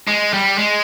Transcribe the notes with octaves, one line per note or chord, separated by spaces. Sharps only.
G#3
G3
G#3